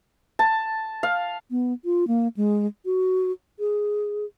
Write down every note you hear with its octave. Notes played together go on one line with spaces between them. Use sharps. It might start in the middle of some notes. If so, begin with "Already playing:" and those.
A5
F5
B3
F4
A#3
G#3
F#4
G#4